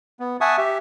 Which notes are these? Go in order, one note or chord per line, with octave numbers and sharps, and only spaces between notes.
B3
E5 F#5 G#5 A5 C#6 D#6
G4 E5